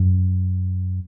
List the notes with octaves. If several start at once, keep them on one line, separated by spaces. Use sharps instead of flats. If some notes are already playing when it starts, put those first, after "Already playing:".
Already playing: F#2